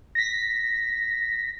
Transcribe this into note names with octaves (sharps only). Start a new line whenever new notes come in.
A#6 B6